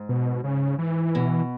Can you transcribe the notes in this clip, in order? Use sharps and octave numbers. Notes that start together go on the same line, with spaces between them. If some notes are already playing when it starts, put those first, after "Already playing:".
Already playing: G#2
B2
C#3
E3
B2